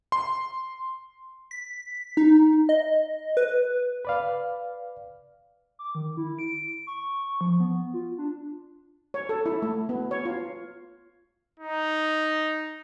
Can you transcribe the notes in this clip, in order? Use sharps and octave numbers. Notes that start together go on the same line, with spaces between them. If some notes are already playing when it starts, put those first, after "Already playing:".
C6
B6
D#4
D#5
B4
B4 D5 F5
D6
D#3
E4
D7
C#6
F3
B3
F4
D4
C#5
A4
E4
A3
B3
C#5
F4
D#4